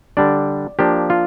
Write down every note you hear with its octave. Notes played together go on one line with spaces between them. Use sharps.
D3 G3 D4 D5
F3 A#3 D4 G4
F4